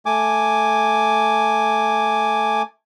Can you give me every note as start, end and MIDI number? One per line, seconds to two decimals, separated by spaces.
0.06 2.62 57
0.06 2.62 80
0.06 2.62 86